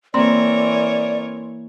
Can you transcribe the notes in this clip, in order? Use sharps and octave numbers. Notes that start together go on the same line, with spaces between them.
E3 A#3 C4 A#4 C#5 D5